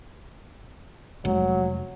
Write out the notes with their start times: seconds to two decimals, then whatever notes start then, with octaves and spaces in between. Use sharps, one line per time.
1.25 F1 F#3 G#3